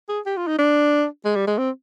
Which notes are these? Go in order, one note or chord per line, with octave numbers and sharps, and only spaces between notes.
G#4
G4
F4
D#4
D4
G#3
G3
G#3
C4